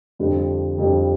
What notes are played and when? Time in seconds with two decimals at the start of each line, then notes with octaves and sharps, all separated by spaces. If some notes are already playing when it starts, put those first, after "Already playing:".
0.19 F2 D3 G3
0.78 F2 D3 G3